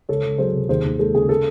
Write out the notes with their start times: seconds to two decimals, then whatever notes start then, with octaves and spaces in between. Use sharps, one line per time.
0.09 C#2 A4 C#5
0.24 C#2
0.38 F#3 G#4 C5
0.54 C3
0.69 D#2 G#4 C5
0.84 D#2
0.99 G#3 A4
1.15 C#3 G#4
1.29 A4